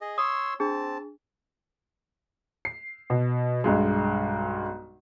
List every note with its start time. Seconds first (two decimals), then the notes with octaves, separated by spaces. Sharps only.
0.01 G#4 D#5
0.18 C#5 C6 D#6 E6
0.60 C4 D4 G#4 A5
2.65 C7
3.10 B2
3.64 B1 G2 G#3